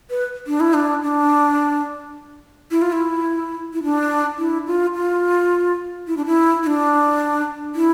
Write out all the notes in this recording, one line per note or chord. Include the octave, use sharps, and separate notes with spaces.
B4
D4
E4
D4
D4
E4
F4
E4
E4
D4
E4
F4
F4
E4
D4
E4
E4
D4
E4